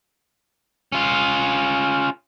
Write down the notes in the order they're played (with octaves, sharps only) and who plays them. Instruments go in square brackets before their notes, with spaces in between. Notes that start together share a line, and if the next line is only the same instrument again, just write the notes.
[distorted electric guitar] C#4 F4